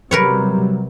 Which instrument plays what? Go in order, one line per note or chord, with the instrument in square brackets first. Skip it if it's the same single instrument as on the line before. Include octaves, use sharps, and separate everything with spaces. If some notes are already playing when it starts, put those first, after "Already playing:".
[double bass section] C3 F#3 G3 [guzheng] A#4 B4 C#5